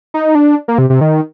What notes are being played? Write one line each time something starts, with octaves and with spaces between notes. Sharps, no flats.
D#4
D4
A#3
C3
C3
D#3